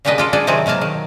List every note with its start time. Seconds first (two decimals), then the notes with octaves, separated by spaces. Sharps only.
0.05 A#2 C#3 G3 D4 B4 D#5
0.18 D4 F4 A4
0.33 D4 G#4 A4
0.47 C3 D#3 F#3 C4 G#4
0.66 B2 F#3 A#3 F5 A5
0.81 D#3